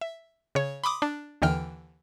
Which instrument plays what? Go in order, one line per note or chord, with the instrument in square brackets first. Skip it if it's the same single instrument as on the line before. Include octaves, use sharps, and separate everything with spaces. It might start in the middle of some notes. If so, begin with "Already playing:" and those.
[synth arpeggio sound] E5
C#3 C#5
B5 C6 D6 D#6
D4
D#2 D3 E3 G5 F6